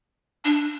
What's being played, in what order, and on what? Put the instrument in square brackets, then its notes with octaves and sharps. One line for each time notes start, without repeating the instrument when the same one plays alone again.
[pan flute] D4